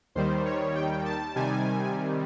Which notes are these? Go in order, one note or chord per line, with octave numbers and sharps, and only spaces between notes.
D#2 D#3 G3 C5
C#5
G5
A5
C3 D#3 G3 G#5